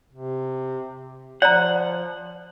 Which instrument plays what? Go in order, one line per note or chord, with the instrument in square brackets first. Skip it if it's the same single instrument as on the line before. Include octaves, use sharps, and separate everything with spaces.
[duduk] C3
[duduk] F3 [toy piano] D5 A#5 [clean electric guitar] F#5